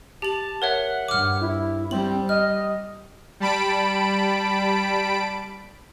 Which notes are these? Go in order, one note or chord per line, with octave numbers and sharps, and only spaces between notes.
G4 A5 F#7
A#4 C#5 E5 F#5
G2 D6 F6
E4
G3 C4 F#7
D#5 F6
G3 A5 B5 D7